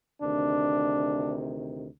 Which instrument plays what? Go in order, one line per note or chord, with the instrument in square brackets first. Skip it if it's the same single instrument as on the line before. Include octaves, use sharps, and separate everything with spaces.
[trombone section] D2 C3 D#3 D4